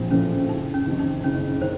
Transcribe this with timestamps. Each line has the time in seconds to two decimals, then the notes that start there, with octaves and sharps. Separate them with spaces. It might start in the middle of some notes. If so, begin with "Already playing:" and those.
Already playing: A#1 A2 F3 C4
0.11 A2 F3 C4 C#4
0.49 F#1 D#4
0.74 C#4
0.86 F2 C3 D#3
0.99 D#4
1.24 F#1 C#4
1.62 D#3 C5